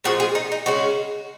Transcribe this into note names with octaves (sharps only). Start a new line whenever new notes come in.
A#2 F3 G#3 F#4
G#4
D#4
D#4
C#3 G#3 C#4 F#4